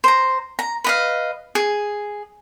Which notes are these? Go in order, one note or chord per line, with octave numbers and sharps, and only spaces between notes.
C5 A#5
A#5
B4 D#5 F5
G#4